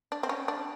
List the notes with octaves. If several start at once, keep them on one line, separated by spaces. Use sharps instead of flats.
D4
C4
C#4
D4